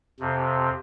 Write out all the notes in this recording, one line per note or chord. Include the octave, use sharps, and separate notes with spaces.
F2 C3